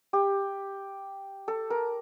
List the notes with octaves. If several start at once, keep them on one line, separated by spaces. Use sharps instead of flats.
G4
A4
A#4